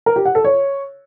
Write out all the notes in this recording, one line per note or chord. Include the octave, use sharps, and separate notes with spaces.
A#4
G4
F#5
A4
C#5